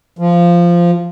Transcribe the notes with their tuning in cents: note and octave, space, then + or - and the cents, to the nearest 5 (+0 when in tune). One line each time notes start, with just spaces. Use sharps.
F3 -10